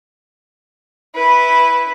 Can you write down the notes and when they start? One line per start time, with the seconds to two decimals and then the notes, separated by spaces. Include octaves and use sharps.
1.15 E4 B4